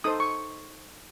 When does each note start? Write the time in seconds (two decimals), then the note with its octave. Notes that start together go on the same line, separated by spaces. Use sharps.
0.04 D#4 A4 C5 D#6
0.20 C#6